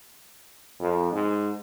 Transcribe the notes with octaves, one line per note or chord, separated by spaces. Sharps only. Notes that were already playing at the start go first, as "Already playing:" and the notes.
F2
G#2